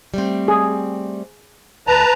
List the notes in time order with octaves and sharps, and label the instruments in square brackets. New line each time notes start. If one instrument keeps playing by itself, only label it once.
[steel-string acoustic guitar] G3 A3 C4
[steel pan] G#4
[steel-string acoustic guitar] D2 D5 [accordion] B4 A5 A#5